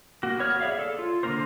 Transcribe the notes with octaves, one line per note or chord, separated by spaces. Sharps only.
A#3 F#4
B3 C#5 F6
G#4 C#5 D5 E5 F5
A4
F4
D3 A#3 C4 A#4 C5